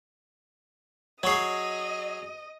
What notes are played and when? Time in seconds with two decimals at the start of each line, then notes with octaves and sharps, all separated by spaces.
1.23 F#3 G#4 C#5 D#5 C#6 C7